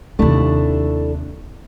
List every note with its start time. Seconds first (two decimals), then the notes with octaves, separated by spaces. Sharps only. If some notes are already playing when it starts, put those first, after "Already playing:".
0.19 D#2 C3 A3 D4 E4